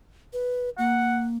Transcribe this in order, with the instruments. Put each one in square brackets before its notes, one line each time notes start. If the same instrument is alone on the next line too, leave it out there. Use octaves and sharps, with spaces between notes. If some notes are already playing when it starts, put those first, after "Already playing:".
[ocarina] B4
[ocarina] A#3 [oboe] F#5